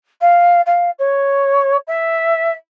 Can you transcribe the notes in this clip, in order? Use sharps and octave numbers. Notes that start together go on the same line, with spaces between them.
F5
F5
C#5
E5